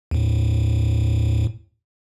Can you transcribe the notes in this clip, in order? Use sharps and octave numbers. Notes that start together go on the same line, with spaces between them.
D#2 A2